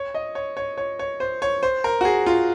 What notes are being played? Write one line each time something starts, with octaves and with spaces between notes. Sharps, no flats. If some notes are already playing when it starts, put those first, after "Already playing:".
Already playing: C#5
D#5
C#5
C#5
C#5
C#5
C5
C#5
C5
A#4
F#4
G#4
F4